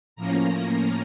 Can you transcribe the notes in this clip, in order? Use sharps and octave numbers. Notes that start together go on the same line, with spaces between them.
A2 F3 A#3 C#4 A#5